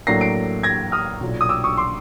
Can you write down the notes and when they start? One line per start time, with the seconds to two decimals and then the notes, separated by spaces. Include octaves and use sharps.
0.07 A2 F#3 A#3 D4 A#6 C7
0.21 C7 D7
0.63 G#6 A#6
0.92 D#6 F6
1.21 B1 A#2 F#3
1.41 D#6
1.49 D6 E6
1.64 C#6 D#6
1.77 C6 D6